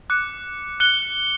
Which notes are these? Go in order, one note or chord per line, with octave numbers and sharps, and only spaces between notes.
D6 F#6 C#7
F#6 C#7 G7